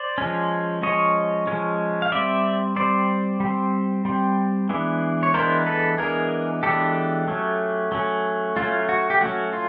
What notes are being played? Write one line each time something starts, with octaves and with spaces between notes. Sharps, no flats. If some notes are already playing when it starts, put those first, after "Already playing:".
Already playing: C5 D5
F3 G#3 C#4
F3 G#3 C#4 C#5 D#5
F3 G#3 C#4
F5
G3 C4 D5 E5
G3 C4 C5 D5
G3
C4
G3 C4
E3 G#3 B3 D4
C#5
E3 G#3 B3 D4 A#4 C5
A4 B4
E3 G#3 B3 D4 G#4 A#4
E3 G#3 B3 D4 G4 A4
F#3 A3 C#4
F#3 A3 C#4
F#3 A3 C#4 F4
F#4
G4
F#3 A3 C#4 F#4
F4